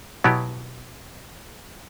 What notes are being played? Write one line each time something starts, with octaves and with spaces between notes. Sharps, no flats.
B2 F#3 B3 E4 G4